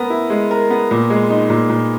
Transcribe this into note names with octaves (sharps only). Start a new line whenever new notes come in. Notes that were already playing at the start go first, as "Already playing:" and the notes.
Already playing: B3 A#4
E4
G#3
A#4
B3
A#2
G#3
D#4
A#2
A#2